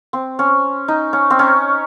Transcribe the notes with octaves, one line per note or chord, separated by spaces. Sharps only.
C4
C#4
D#4
C#4
C4
C#4